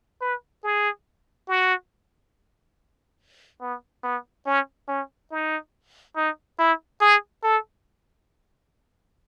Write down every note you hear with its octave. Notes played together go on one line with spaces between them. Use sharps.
B4
G#4
F#4
B3
B3
C#4
C#4
D#4
D#4
E4
G#4
A4